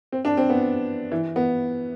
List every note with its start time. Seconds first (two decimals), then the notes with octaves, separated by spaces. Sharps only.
0.12 C4
0.25 D4
0.37 C4
0.50 B3
1.12 E3
1.36 B3